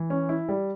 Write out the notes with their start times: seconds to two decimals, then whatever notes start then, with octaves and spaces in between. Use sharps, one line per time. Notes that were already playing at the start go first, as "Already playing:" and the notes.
Already playing: E3
0.10 C#4
0.29 E4
0.49 G3